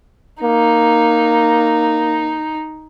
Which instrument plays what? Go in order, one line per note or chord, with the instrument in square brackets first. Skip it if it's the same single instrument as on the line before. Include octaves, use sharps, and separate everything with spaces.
[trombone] A#3 [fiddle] D#4